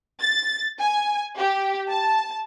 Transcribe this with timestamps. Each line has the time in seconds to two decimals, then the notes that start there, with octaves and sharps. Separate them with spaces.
0.20 A6
0.79 G#5
1.37 G4
1.90 A5